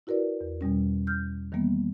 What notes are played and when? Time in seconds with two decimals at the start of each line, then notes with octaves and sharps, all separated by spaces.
0.07 E4 F#4 A#4 B4 D5
0.41 E2
0.61 E2 B2 G3 C#4
1.07 F6 G6
1.52 D#3 E3 G3 A#3 B3